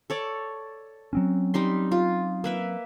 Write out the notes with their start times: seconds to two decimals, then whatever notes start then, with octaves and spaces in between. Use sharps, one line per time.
0.10 A4 C#5 D5
1.13 F#3 C4 C#4
1.54 G3 D#4 C6
1.92 F4
2.44 A#3 B4 E5